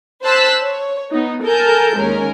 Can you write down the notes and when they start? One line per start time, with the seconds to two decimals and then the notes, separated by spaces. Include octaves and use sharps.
0.23 C5 A5 E6 F#6 B6
0.62 C#5
1.11 B3 D#4
1.43 A4 A#4 G#5 A5 G6
1.95 D#2 G#3 C#4 A#4